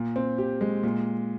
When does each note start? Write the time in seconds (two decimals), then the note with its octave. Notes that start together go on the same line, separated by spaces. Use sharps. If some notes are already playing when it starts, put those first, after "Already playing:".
Already playing: A#2
0.16 C4
0.38 G4
0.61 G#3
0.83 A#2